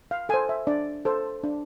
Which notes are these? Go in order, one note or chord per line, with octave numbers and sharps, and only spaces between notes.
F5
A4 C5 G#5
E5
D4 D5
A4 C5
D4